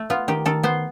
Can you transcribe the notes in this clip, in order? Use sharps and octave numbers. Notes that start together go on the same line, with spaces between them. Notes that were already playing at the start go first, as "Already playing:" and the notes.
Already playing: A3
B3 F4
D#3 G4
D#3 A4
B3 C5